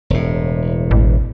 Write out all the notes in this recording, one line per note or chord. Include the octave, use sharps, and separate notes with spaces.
E1 A2
A1